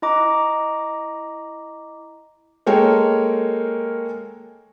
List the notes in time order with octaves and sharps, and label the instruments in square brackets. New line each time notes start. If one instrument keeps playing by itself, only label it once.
[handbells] E4 D#5 A#5 D6
[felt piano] G#3 A#3 A4 A#4 C#5 G5